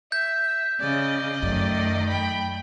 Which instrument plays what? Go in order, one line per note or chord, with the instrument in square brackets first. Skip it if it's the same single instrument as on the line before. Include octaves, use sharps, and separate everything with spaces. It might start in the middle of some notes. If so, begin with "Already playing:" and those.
[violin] E5 [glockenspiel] G6
[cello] C#3 [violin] D5 D#5
[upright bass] F#2 [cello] D#3 A3
[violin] G5 B5